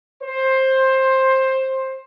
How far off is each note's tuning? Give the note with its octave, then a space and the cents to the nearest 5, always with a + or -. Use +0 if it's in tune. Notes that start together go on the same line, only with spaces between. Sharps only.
C5 +15